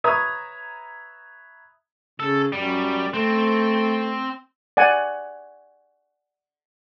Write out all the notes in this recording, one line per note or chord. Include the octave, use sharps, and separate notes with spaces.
B4 C#5 E5 A#5 D#6 G#6
C#3 A4
F#2 G3
A3 C4
D5 F#5 G#5